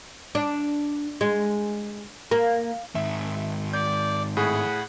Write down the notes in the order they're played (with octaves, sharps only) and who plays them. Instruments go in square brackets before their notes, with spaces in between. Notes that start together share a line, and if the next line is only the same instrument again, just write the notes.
[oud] D4
G#3
A#3
[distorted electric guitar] G#2 D#3 [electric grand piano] E5
[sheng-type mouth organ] D5 [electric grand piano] G6
[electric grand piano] A2 G#4 [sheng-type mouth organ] F#5 B5